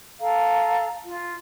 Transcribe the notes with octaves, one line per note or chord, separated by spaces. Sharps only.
A4 F5 A#5
F4